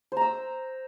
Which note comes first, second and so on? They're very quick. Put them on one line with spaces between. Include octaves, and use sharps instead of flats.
C5 A#5 E6